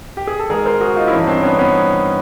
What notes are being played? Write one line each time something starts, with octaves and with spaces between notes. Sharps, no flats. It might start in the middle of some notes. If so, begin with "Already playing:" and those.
G4
G#4
A4
G#2 D#3 G#4 A#4
A#4 C5
F#4 G#4
D#4 F4
E4
G2 E3 C#4 D#4
C4 D4
B3 C#4
B3 C#4